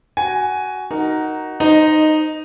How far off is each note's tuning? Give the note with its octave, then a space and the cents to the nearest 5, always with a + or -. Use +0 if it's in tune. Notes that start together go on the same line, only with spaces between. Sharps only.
F#4 +15 G#5 +5
D#4 +0 F#4 +15 A#4 -5
D#4 -10 C5 +0 D#5 +0